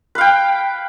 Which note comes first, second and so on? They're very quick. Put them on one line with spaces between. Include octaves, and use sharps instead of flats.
B4 F5 G5